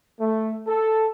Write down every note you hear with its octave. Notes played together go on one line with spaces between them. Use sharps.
A3
A4